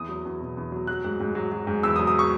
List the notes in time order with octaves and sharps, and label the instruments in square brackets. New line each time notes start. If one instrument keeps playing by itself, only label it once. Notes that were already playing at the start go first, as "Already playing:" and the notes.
Already playing: [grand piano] E2 D#6
F#3
E2
B2
E2
F#3
F#3 F#6
G#2
G#2
F#3
F#3
G#2
E2 E6
D#6
F#3
D#6
C#6